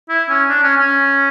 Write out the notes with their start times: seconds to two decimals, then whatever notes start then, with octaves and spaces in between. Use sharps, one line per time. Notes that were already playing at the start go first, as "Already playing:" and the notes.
0.09 E4
0.29 C#4
0.49 D4
0.63 C#4
0.77 C#4